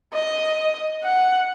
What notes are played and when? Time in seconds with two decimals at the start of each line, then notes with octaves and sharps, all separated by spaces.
0.13 D#5
1.04 F#5